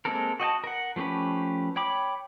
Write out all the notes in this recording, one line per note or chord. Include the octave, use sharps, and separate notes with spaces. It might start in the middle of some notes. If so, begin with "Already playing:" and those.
G#3 A#3 C4 A4 A#4
F#4 D#5 G5 A5
A#4 F#5
F3 A3 C#4 G4 B4
C#5 G5 B5 D6